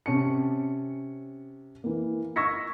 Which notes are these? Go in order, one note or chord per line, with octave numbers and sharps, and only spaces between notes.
C3 C#4 A5 C#7
E3 A#3
C#6 E6 G#6 A#6 B6 C#7